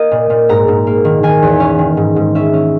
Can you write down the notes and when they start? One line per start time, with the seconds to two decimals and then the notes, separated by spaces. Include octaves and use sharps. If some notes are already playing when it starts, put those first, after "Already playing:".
Already playing: A#3 D#5
0.11 A#2
0.30 A#2
0.49 G#2 A#5
0.68 G#2
0.87 A#3
1.05 D#3
1.23 D#3 G#5
1.42 E2
1.60 C#4
1.78 D#3
1.97 G#2
2.16 G#2
2.35 C#4 E5
2.53 C#4